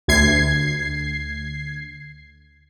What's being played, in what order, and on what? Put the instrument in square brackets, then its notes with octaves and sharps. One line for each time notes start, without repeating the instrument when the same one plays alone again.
[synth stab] D2 G#6 C7